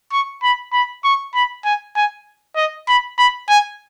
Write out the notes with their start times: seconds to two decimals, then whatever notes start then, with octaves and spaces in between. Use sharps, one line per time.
0.12 C#6
0.43 B5
0.73 B5
1.04 C#6
1.34 B5
1.65 G#5
1.96 G#5
2.56 D#5
2.88 B5
3.18 B5
3.49 G#5